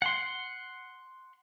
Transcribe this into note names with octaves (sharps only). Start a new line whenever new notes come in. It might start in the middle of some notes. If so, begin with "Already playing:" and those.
F#5 C6